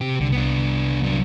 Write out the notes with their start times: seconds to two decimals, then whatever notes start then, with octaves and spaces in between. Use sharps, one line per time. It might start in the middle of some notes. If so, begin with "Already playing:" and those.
0.01 C3 G4
0.20 C2 D3
0.32 B3 D4
1.03 F#3 D4